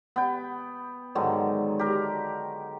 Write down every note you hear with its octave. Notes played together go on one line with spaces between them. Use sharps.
B3 G5
G#2 D3 D#3 F#3
G4 A#4